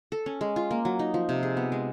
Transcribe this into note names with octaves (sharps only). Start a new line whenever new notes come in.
A4
C#4
G#3
F4
A#3
F#3
D#4
F3
C3
G#4
B3
G#3